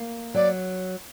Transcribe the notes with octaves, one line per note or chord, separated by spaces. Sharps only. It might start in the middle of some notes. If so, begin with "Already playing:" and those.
Already playing: A#3
F#3 D5